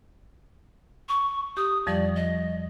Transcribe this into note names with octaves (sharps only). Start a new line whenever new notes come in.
C#6
G4 D#6
F2 F3 G3 D5
D#5